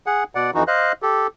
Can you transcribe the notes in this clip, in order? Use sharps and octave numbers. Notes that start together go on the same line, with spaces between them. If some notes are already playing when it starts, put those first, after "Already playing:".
G#4 F#5
B2 D5 F#5
F2 E3 D#4 F#4
C5 D#5 F5 F#6
G4 A4